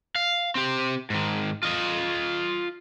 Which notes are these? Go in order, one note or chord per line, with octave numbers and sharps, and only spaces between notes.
F5
C4 G4
G#2 D#3
F4 D#5